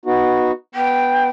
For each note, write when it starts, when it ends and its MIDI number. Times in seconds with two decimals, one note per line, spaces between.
0.06 0.52 59
0.06 0.52 63
0.06 0.52 66
0.75 1.29 59
0.75 1.26 79